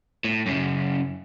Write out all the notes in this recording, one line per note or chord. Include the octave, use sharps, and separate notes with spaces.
A2
F#2 C#3